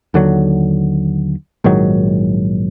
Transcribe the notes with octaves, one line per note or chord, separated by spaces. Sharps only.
D#2 D3 F#3
A#1 G#2 D#3 F#3